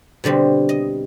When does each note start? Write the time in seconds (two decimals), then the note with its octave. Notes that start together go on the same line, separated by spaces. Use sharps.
0.24 B2 D3 G3 C4
0.69 D#5